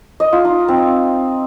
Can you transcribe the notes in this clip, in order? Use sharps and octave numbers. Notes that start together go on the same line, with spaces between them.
D#5
F4
D#4
C4